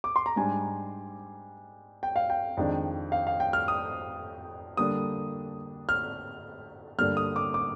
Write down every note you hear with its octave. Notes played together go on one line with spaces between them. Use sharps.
D6
C6
A#5
G#2 G3 D4 G#5
G5
F5
G5
F2 D#3 G#3 D4
F5
F5
G5
F6
D#6
D3 G3 A#3 D4 D#6
F6
G2 D3 G3 A#3 D4 F6
D#6
D6
D6